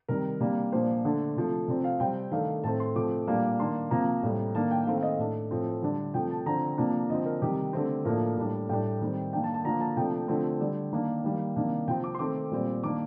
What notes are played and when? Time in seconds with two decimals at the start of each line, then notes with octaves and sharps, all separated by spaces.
0.08 C3 D#3 G3 A#4
0.41 C3 G3 A#3 D4
0.72 A#2 F3 A#3 D4 C5
1.05 D3 A3 D4
1.36 C3 F3 A3
1.68 C3 F3 C4 D5
1.84 F5
2.00 C3 G3 C4 G5
2.32 D#3 A3 D4 F5
2.64 A2 A3 C4 A5
2.80 C6
2.95 C3 F3 A3 C4 D6
3.28 A#2 G3 A#3 D4
3.59 D#3 A#3 D4 C6
3.91 C3 F3 A#3 A#5
4.23 A2 G3 C4
4.55 D#3 A#3 D4 A5
4.71 G5
4.87 D#3 A3 C4 F5
4.97 F5
5.03 D#5
5.19 A2 A3 D4
5.51 A2 F3 C4
5.83 D3 G3 D4
6.14 C3 F3 A3 G5
6.30 A5
6.46 D3 F3 C4 A#5
6.78 C3 F3 A#3 D4
7.10 D3 F3 C4 D#5
7.26 A#4
7.42 C3 D#3 G3 G4
7.73 D3 A3 C4
8.05 A2 F3 A#3 D4 A#4
8.37 A2 G3 D4
8.69 A2 G3 D4 G5
9.01 D#3 G3 C4
9.33 D#3 A#3 D4 G5
9.44 A5
9.54 A5
9.64 D3 F3 A#3 A#5
9.80 A5
9.97 C3 F3 A3 D4 G5
10.28 D3 F3 A3 C4
10.60 D3 G3 D4
10.93 D#3 A#3 D4
11.24 D#3 G3 A#3
11.56 C3 D#3 A#3 D4
11.88 C3 F3 C4 G5
12.04 D6
12.15 C6
12.19 D#3 A3 C4 D6
12.51 A#2 G3 C4
12.84 D#3 A#3 D4 D6